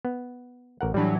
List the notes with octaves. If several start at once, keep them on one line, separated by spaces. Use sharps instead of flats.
B3
A1 A#4 F#5
A2 E3 F#3 G3 D4